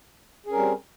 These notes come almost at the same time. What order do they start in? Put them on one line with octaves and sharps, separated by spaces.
G#4 C#4 A#4 G3 C4